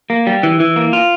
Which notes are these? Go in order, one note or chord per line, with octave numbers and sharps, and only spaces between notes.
A#3
G3
E3
E3
A#3
F4